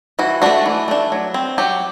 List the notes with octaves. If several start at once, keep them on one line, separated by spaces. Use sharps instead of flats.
E3 F#4
A3 D4 F#4
E3
A3 D4
F#3
C4
F#3 G4